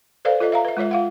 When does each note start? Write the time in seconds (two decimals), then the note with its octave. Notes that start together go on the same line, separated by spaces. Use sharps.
0.25 A4 B4 C5 D5 F5
0.40 F4 A4 C#5 D#5
0.52 E5 F5 A#5
0.65 B4 E5
0.77 G#3 F4 C#5 E5
0.91 F4 F5 F#5